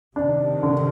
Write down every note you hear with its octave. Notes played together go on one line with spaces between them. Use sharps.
C3 D#3 D4
D3